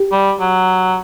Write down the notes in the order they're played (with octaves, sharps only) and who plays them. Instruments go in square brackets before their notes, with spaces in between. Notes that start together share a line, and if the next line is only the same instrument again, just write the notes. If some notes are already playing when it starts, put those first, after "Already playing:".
Already playing: [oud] G4
[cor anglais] G3
F#3